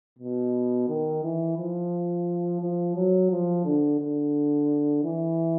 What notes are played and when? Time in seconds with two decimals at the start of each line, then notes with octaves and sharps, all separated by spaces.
0.19 B2
0.88 D#3
1.23 E3
1.58 F3
2.61 F3
2.96 F#3
3.31 F3
3.65 D3
4.00 D3
5.04 E3